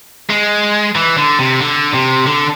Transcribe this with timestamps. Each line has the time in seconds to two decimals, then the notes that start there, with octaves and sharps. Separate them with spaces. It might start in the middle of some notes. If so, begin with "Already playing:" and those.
0.30 G#3
0.95 E3
1.17 D3
1.39 C3
1.61 D3
1.94 C3
2.27 D3